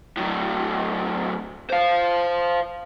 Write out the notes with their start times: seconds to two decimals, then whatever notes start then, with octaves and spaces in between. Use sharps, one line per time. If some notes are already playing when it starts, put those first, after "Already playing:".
0.17 A2 F#3
1.70 C5 F5